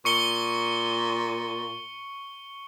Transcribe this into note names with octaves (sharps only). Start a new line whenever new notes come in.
A#2 C#6 C#7 G7